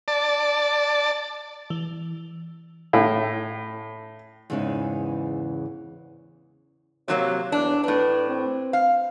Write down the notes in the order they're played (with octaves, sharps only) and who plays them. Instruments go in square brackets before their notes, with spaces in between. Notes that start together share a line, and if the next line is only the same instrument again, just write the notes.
[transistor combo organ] D5 A5
[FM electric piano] E3
[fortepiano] A2
[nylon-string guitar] E2 G#2 C#3 E3 D#4
[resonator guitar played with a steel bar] C3 F#3 A#3 [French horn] C#5
[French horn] E2 [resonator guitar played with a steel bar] D4
[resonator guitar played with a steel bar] A2 D4 [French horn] B4
[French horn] C4
[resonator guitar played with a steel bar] F5